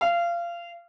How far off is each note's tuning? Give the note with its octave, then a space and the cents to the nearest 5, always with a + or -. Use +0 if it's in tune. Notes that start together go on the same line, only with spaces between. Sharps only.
F5 -25